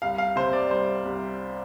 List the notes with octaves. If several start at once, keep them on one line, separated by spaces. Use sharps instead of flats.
C2 F5
F5
C3 C5
D5
G3 C5
C2